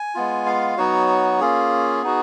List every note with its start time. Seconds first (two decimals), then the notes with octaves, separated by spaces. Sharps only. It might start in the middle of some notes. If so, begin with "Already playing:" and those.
Already playing: G#5
0.15 G#3 B3 F4
0.46 F5
0.77 F#3 B3 D#4 F#4 C#5
1.40 A#3 C#4 F4 G#4
2.02 B3 D#4 F#4